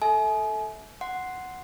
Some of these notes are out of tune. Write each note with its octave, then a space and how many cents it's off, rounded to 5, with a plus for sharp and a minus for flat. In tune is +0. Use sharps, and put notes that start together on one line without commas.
A4 +0 E5 -25 G#5 +40
F#5 +0 C6 +0